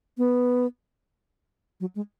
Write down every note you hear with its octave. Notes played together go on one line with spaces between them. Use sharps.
B3
F#3
G#3